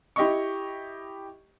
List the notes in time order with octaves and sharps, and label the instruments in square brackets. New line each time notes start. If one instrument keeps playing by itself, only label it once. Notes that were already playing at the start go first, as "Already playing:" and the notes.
[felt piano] E4 G4 D#5 C#6